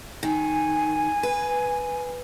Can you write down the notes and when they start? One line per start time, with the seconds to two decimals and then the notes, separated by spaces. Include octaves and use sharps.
0.23 D#3 G#5
1.23 B4